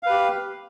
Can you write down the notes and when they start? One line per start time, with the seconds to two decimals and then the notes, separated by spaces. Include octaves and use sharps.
0.03 F5
0.06 B4
0.10 G4